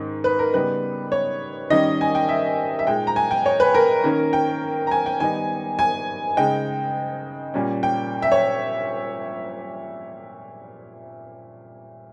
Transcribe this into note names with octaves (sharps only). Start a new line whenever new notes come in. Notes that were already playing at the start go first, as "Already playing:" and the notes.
Already playing: G#2 D#3 C#4
B4
A#4
C#3 G3 B3 D#4 B4
C#5
D#3 G3 C#4 D#5
G#5
G5
E5
E5
A#2 G#3 D#4 G5
A#5
G#5
G5
C#5
B4
A#4
D#3 A#3 C#4
G5
A#5
G#5
G5
D#3 G3 B3 D#4 G#5
G#5
C#3 G#3 D#4 G5
A#2 G3 A#3 C#4
G5
E5
C#5